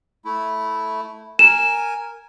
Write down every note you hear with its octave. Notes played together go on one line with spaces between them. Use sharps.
A3 E4
A#4 G#5 E7